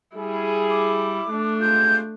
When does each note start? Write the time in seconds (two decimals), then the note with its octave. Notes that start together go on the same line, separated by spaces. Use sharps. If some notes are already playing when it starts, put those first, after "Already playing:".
0.16 G3 E4 G#4
0.70 D6
1.29 A3 D4
1.61 C3 G#3 F4 G6